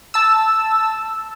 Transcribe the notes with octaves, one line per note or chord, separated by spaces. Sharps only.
A5 E6